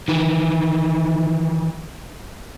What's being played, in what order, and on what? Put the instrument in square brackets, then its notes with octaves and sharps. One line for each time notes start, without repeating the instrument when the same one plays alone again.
[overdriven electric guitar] D#3 E3